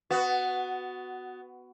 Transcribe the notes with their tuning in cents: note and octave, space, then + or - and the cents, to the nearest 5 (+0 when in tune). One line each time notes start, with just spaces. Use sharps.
B3 +15 F#4 +0